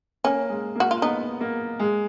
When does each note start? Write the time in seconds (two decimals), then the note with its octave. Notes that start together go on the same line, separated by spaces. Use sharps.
0.24 A#3 C#4
0.50 G#3
0.76 A#3 F#4
0.91 F4
1.02 B3 D#4
1.41 A#3
1.79 G#3